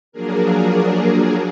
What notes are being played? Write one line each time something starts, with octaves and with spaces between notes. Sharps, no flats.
F3 F#3 A#3 D4 G#4 A#4